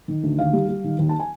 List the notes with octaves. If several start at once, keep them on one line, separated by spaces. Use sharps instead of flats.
D#3
D2
D#2 F5
G3
G3
D#3
D#2
A5
G#5